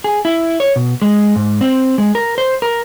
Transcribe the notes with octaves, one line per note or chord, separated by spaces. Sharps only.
G#4
E4
C#5
B2
G#3
G#2
C4
G#3
A#4
C5
A#4